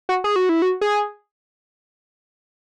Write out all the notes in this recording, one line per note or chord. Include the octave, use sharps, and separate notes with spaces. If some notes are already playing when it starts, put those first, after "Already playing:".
F#4
G#4
F#4
E4
F#4
G#4